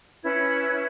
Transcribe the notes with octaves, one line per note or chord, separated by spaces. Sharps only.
C#4 E4 B4 G#6